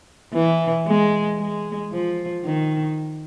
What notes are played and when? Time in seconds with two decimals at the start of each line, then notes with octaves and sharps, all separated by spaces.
0.33 E3
0.86 G#3
1.39 G#3
1.92 F3
2.45 D#3